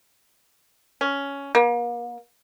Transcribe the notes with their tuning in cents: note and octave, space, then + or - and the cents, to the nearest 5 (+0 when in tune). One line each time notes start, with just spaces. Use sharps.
C#4 +10
A#3 +40